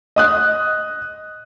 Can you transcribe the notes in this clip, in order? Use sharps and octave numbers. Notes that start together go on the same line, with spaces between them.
D#5 D#6 F#6